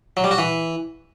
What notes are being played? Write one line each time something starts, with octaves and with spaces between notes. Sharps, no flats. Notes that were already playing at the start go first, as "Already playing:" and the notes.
F#3
G3
F#4
E3